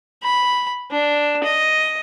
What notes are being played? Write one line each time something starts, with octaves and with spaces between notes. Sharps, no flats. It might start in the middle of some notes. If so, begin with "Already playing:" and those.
B5
D4
D#5